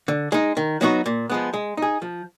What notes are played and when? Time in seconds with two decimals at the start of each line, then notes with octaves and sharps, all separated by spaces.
0.08 D3
0.32 G#3 D#4
0.57 D#3
0.81 F#3 B3 D#4 F#4
1.06 A#2
1.30 F3 G#3 B3
1.54 G#3
1.77 D#4 G#4
2.02 F3